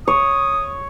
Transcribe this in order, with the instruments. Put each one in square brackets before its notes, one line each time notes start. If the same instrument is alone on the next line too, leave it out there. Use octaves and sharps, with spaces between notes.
[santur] C#5 [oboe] D#6